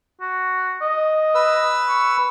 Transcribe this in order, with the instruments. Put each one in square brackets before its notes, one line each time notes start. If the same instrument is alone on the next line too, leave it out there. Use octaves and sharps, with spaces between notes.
[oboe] F#4
D#5
[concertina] B4 E6
[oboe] C#6